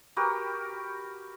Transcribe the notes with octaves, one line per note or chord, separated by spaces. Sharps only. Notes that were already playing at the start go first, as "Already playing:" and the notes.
F#4 G4 A#4 B4